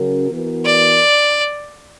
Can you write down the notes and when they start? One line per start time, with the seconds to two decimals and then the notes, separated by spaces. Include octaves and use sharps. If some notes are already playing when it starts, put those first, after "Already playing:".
Already playing: C#3 F#3 C#4 F#4 A#4
0.30 E3 B3 F#4 A#4
0.65 D5